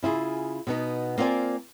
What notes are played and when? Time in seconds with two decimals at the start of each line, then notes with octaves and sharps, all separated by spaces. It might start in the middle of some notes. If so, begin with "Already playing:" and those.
0.03 C#3 E4 F4 G#4
0.67 B2 B3 D#4
1.18 A#3 C4 F4 A4 D5 G#5